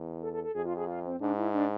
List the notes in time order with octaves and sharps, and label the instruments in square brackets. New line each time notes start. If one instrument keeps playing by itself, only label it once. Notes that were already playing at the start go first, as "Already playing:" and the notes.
Already playing: [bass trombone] E2
[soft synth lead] A4
A4
A4
[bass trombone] F2 [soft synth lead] G#4
[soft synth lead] F4
G#4
F4
C4
[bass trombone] G#2 [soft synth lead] D4
[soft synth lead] E4
D4